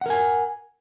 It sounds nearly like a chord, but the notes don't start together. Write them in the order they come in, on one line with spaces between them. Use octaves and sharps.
F#5 A#4 G#5